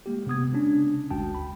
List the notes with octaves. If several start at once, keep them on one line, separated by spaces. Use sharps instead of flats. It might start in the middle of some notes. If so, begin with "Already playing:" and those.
G#3 A#3 G4
C3 B3 D#6 G#6
C#3 G#3 C#4 D4
G1 D2 G#3 F#4 G5 A5
B5